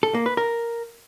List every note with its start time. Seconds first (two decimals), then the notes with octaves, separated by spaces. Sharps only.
0.03 A4
0.14 A#3
0.26 B4
0.37 A#4